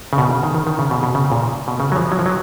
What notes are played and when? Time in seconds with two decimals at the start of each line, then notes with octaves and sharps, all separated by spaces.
0.13 C#3
0.18 B2
0.31 C#3
0.43 D#3
0.54 D#3
0.67 D#3
0.79 C#3
0.91 B2
1.03 B2
1.15 C#3
1.32 A#2
1.68 B2
1.80 C#3
1.92 F#3
1.96 F3
2.12 F#3
2.19 F3
2.26 F#3